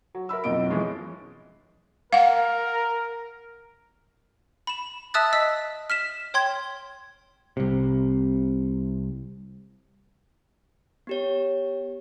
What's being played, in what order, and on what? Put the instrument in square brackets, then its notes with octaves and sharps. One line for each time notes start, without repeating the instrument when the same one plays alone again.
[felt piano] F#3
A#4 E5 B5 E6
F#1 B1 F2 B2 D#5 D7
E3 F3 G#3 C#4
[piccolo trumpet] A#4 [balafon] F5 F#5
[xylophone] B5 E7
E5 A5 D#6 E6 F#6 A6
D#5 E6 B6
F6 B6 E7
C#5 G5 C6 G#6
[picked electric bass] C2 C3
[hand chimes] B3 G4 C#5